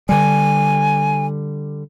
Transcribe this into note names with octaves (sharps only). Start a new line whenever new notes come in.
D3 G3 G#5